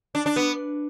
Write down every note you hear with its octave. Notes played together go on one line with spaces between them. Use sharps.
D4
D4
B3